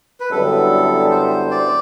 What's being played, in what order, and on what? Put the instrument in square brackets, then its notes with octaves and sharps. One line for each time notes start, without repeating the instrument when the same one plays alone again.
[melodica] B4
[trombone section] F#2 D3 G3 B3 E4 [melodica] A4
[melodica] C5
D5